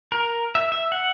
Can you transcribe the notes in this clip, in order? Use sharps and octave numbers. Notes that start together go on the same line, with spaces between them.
A#4
E5
E5
F#5